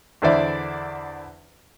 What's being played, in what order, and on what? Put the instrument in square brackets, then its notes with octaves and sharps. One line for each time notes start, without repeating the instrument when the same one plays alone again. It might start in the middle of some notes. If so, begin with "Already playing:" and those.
[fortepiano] E2 D3 E4 C5 D5 E5